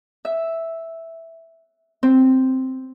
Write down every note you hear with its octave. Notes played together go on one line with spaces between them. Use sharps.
E5
C4